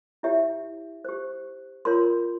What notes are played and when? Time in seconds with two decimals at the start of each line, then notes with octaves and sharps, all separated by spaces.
0.23 E4 G4 C#5 E5
1.05 G4 C5
1.85 F4 A#4 C#5 C6